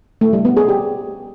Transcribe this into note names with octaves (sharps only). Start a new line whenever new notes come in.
A3
G3
B3
G#4
G4